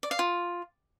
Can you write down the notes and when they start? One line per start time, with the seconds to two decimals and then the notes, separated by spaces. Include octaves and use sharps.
0.03 D5
0.11 F5
0.19 F4